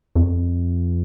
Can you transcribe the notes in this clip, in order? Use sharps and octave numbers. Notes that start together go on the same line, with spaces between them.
F2